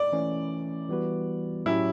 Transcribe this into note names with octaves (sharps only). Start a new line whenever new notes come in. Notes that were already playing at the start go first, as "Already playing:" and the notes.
Already playing: D5
E3 A3 C#4 E4
E3 G3 B3 F#4 B4
A2 F#3 C#4 E4 G4